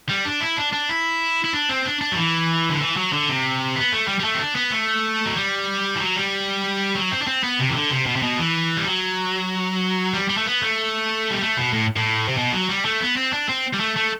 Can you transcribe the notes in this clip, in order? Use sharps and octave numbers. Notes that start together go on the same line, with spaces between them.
G3
D4
E4
D4
D4
E4
E4
D4
C4
D4
D4
F#3
E3
D3
E3
F#3
D3
C3
B3
A3
G3
G3
A3
C4
D4
B3
A3
F#3
G3
E3
F#3
G3
F#3
C4
D4
C4
B3
C3
E3
D3
C3
B2
C3
B2
E3
G3
F#3
G3
G3
A3
B3
A3
G3
A3
B2
A2
A2
C3
B2
F#3
G3
A3
B3
C4
D4
C4
G3
A3
A3